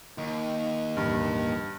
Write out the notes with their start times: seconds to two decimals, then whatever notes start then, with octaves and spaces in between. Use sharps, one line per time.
0.18 D#2
0.97 E1 A1 G2